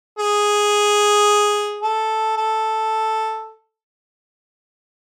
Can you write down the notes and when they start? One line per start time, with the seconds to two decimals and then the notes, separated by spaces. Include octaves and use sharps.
0.19 G#4
1.82 A4
2.37 A4